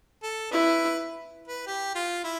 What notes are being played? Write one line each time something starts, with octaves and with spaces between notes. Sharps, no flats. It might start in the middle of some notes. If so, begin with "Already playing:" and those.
A4
E4 B4
B4
G4
F4
E4